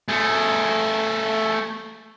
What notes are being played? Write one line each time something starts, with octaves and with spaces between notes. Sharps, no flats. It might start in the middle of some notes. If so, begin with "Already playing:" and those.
A3 G#4